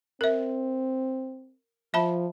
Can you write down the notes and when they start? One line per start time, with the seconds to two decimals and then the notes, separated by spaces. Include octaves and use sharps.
0.21 C4 A#4 E5
1.94 F3 E5 A5 B5